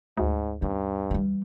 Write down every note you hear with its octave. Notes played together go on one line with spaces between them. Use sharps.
D2 G#2
G2 B3 C#4
E3 G3